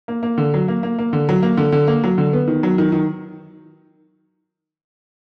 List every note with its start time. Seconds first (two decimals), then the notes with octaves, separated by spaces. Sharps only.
0.08 A#3
0.23 A#3
0.38 D3
0.54 F#3
0.68 A#3
0.83 A#3
0.99 A#3
1.13 D3
1.29 F#3
1.42 A#3
1.57 D3
1.72 D3
1.87 A#3
2.04 F#3
2.18 D3
2.33 B3
2.48 D#3
2.63 F#3
2.78 D#3
2.92 D#3